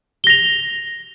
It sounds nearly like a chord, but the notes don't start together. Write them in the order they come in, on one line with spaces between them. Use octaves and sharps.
G7 A#6 F7